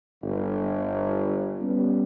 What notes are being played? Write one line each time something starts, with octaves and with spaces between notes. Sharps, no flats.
G1
G3 B3 C#4